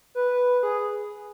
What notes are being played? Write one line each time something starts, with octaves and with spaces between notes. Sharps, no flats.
B4
G#4